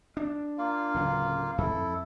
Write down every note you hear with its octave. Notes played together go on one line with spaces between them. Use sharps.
D4
A#3 F4 F5
D1 C#3 F#3
F2 E4 A4